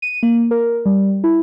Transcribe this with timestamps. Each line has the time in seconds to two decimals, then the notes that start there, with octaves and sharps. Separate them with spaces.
0.02 D#7
0.23 A#3
0.51 A#4
0.85 G3
1.24 E4